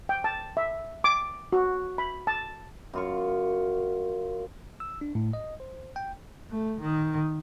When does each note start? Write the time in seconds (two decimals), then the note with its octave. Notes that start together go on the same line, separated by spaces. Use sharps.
0.09 G5
0.24 A5
0.57 E5
1.04 D6
1.52 F#4
1.98 B5
2.27 A5
2.93 F#2 F4 C#6
4.80 E6
5.01 D4
5.15 A2
5.33 D#5
5.60 C5
5.96 G5
6.50 A3
6.81 D#3